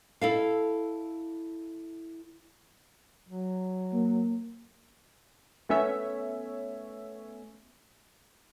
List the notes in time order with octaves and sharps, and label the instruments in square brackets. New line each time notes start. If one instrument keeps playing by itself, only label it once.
[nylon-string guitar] E4 A4 F5
[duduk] F#3
[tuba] A#3
[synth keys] A3 B3 C#4 C#5 E5